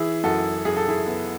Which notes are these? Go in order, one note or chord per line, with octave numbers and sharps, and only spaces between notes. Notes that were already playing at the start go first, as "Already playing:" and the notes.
Already playing: E3 E4 G#4
F#2 F#4 A4
F#2 G#4
A4
E4 G#4
B3